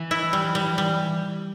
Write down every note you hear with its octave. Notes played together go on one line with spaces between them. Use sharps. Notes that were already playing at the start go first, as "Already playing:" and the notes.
Already playing: E3
E4
G3
G3
G3